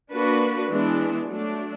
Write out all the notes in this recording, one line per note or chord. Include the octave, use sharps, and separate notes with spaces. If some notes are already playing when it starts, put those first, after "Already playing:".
A#3 D4 F#4 B4
E3 G#3 B3 D4
F#3 A3 D4